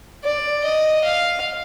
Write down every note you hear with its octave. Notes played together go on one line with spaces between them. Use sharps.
D5
D#5
F5